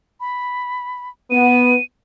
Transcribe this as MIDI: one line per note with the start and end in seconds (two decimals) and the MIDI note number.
0.20 1.09 83
1.31 1.75 59
1.31 1.83 99